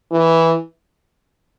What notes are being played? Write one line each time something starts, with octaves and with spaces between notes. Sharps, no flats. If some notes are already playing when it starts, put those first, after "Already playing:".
E3